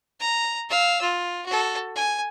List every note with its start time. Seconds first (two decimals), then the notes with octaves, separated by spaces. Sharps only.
0.20 A#5
0.69 F5 E6
1.02 F4
1.46 F#4 A4
1.96 G#5